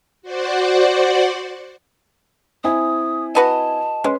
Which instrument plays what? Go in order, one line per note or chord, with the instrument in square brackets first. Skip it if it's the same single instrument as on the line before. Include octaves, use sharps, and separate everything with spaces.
[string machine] F#4 C5 D5 F#5
[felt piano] C4 E4 G#5 [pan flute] D#6
[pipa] F#4 B4 D#5 [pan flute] A5
[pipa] G#3 [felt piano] C#4 B4 C6